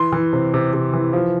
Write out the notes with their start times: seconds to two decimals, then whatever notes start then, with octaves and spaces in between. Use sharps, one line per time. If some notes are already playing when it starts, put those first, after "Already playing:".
Already playing: E3 C6
0.13 E3
0.33 C3
0.54 C3
0.73 C3
0.93 E3
1.13 F3